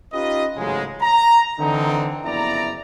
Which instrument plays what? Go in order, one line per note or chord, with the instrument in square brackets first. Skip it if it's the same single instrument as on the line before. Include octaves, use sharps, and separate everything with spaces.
[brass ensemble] C#4 D#4 F4 G4 B4 D#5
A1 G#2 C#3 F#3 G#3
A#5
D3 E3 C4 D#4
F#1 F2 B3 E4 D5 A#5